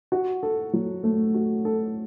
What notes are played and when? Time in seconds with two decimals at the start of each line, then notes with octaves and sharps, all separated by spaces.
0.12 F#4
0.43 A4
0.73 F#3
1.03 A3
1.34 F#4
1.65 A4